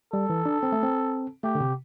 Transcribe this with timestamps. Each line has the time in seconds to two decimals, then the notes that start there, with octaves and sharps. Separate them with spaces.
0.13 G3 A4
0.30 E3
0.46 D4
0.63 C4
0.72 A3
0.83 C4
1.44 A3 G4
1.55 D3
1.61 C3